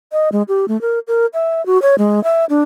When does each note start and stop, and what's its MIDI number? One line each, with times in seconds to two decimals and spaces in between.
0.12 0.29 75
0.32 0.43 56
0.48 0.66 67
0.68 0.80 57
0.81 0.99 70
1.08 1.26 70
1.34 1.64 76
1.66 1.80 66
1.82 1.95 73
1.98 2.22 56
2.24 2.45 76
2.50 2.63 62